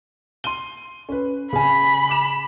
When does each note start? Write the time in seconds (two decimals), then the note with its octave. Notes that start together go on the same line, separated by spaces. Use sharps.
0.44 C6 D#7 G7
1.09 C#4 B4
1.53 C#3 G#5 B5
2.09 D6 E7